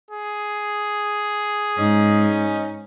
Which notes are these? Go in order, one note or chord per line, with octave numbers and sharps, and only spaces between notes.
G#4
G#2 C#4 D#4